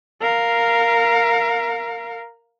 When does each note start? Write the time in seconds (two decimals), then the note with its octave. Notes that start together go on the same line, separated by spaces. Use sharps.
0.21 A#4 F5